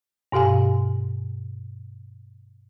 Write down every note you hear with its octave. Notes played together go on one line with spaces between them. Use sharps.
G2 B2 G4 F5 G#5